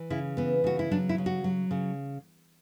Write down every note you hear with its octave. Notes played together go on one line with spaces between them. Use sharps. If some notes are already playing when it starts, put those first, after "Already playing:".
Already playing: E3
C#3 E4
E3 B3
C#3 F#4
E4
F#3 D4
E4
C#3
F#4
F#3
C#3